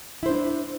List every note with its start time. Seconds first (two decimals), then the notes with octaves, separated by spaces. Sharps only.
0.23 E4
0.26 C5
0.29 D4